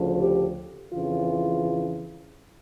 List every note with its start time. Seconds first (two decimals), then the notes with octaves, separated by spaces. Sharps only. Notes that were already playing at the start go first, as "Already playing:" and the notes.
Already playing: D2 C#3 F3
0.21 G4
0.94 F2 C#3 E3 F4